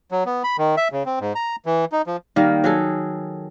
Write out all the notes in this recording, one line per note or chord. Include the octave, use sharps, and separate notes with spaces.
F#3
B3
B5
D#3
E5
C#3
C4
G#2
A#5
E3
D#4
F3
D#3 G3 A#3
F#3 G#4 A4